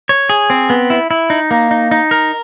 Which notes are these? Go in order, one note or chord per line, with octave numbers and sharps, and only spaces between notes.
C#5
G#4
C4
B3
E4
E4
D#4
A#3
D#4
D#4
A#4